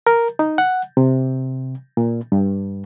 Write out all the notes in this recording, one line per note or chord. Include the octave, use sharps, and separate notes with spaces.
A#4
D#4
F#5
C3
A#2
G2